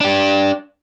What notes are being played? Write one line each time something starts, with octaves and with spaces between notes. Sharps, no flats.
D4 G4